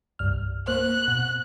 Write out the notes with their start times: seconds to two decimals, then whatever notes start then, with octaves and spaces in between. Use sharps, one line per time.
0.19 C2 G2 F6
0.67 A#3 C5 F#6
1.08 B2